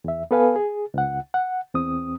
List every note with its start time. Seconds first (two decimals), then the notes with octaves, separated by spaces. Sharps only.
0.04 E2 E5
0.31 B3 A4 B4 F5 G#5
0.56 G#4
0.94 C#2 F#5
1.34 F#5
1.74 E2 C4 D#6